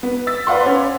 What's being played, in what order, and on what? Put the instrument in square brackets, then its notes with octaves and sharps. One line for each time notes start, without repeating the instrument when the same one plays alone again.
[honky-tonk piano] B3
E6 A6 B6
B4 D5 F5 F#5 C6
C#4